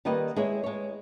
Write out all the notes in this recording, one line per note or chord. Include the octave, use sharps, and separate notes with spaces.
D#3 G3 A#3 B4 D#5 G5
G#3 E4 G#4 C#5
G#3 C#5